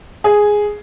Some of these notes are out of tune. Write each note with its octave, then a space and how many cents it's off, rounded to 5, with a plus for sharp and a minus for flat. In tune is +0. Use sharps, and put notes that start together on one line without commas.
G#4 +0